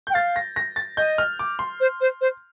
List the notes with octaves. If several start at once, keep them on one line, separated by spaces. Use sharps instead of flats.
G6
G5
F5 A6
A#6
A#6
A6
D#5 G6
F6
D6
C6
C5
C5
C5